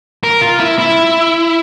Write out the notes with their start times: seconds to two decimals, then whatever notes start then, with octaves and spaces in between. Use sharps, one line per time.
0.24 A#4
0.42 F4
0.60 E4
0.79 E4